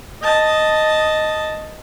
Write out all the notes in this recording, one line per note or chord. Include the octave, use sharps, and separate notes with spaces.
D#5 A5